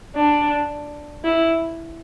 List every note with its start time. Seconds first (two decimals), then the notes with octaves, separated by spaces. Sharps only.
0.15 D4
1.24 E4